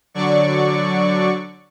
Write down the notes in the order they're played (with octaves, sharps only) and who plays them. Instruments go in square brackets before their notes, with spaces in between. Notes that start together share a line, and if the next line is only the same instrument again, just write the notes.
[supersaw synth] D3 F#3 D5 C#6